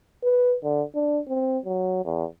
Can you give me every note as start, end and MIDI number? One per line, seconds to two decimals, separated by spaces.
0.23 0.56 71
0.63 0.83 50
0.95 1.20 62
1.28 1.58 60
1.65 2.03 54
2.05 2.25 40